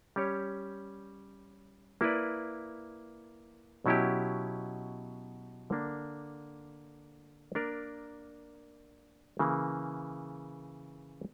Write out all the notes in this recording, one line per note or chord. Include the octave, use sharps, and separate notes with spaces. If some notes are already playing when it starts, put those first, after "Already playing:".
G3 C#4 G4 C#5
A#3 E4 B4 D5
B2 F#3 C#4 E4 G4
D3 A#3 D4
A#3 D4 A#4 D5
C#3 E3 A#3